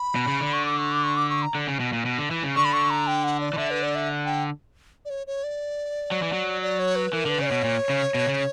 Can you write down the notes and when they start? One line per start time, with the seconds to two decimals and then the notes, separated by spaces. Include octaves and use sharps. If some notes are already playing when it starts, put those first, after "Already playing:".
Already playing: B5
0.15 B2
0.28 C#3
0.41 D3
0.53 C#6
0.66 D6
0.78 C#6
0.92 D6
1.04 C#6
1.17 D6
1.30 C#6
1.42 A#5
1.55 D3
1.67 C#3
1.80 B2
1.93 A#2
2.05 B2
2.18 D3
2.31 E3
2.43 C#3
2.56 D3 C#6
2.65 B5
2.73 C#6
2.90 A#5
3.07 G5
3.24 F#5
3.40 D5
3.53 E3
3.58 D3 E5
3.70 B4
3.83 D5
3.95 E5
4.25 G5
5.05 D5
5.10 C#5
5.27 C#5
5.44 D5
6.11 F#3
6.22 E3
6.33 F#3
6.62 D5
6.79 C#5
6.96 B4
7.13 E3 A#4
7.26 D3 B4
7.39 C#3 D5
7.47 B2 C#5
7.64 A#2
7.89 C#3
8.15 B2
8.28 C#3